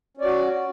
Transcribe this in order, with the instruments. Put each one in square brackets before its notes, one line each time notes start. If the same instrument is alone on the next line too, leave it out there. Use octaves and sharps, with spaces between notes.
[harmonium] C#4
D5
F#4